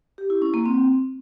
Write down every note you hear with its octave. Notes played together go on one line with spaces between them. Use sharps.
G4
E4
C#4
A#3
C4